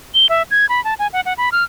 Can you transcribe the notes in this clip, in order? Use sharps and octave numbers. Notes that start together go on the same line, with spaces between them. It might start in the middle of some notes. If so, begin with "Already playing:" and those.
G7
E5
G#6
B5
A5
G#5
F#5
F#5
B5
F6